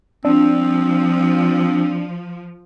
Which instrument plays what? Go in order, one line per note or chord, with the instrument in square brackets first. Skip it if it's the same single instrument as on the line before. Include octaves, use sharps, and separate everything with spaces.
[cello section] F3 [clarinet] C4 [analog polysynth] D4